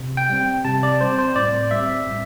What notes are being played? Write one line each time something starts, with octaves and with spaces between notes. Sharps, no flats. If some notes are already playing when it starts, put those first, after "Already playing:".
Already playing: C3
G5
G3 C4
C3 A5
D5
G3 C4 C5
C5
A2 D5
G3 C4 E5
A2